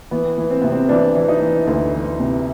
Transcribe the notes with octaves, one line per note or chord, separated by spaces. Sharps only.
E3 B3
E3
C4
C3 B3
C4
E3 D4
E3
D#4
E3
D2 E4
E3
C3